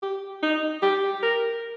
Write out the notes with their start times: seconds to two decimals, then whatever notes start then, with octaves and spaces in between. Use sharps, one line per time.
0.02 G4
0.42 D#4
0.82 G4
1.22 A#4